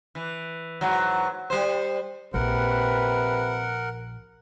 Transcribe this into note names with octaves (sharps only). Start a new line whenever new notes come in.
E3
G#2 E3 F#3
G3 C5
A#1 C3 A#4 B4 F#5